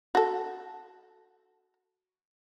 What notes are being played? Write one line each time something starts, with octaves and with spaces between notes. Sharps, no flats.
F#4 A4